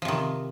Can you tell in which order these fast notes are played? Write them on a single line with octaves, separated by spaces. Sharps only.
F3 C3 D#3